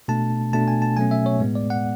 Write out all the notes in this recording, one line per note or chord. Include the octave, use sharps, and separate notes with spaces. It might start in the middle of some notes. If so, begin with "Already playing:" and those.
B2 A3 D4 A5
B2 A3 D4 A5
G#5
A5
B2 F#3 A3 C#4 G#5
E5
C#5
A2 G#3 B3
D5
F#5